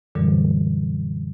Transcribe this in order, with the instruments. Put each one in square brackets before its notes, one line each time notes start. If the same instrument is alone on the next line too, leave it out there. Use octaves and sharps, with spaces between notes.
[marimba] F#2 A#2 D3 E3 F#3 G3